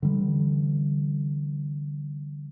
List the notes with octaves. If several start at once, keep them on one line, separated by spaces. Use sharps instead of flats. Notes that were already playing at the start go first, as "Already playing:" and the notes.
D3 E3 G3